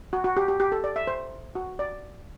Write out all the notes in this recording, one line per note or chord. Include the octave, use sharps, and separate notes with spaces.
F#4
F#4
G4
G4
G4
A4
D5
E5
C5
F#4
D5